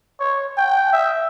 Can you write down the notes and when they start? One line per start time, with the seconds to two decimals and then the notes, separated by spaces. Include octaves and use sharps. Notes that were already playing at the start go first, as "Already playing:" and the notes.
0.20 C#5
0.57 G5
0.93 E5